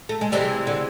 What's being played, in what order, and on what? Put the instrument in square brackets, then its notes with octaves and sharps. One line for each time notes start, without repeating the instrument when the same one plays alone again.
[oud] A3
G#3
[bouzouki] C3 E3 G#3 [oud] G3
[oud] D3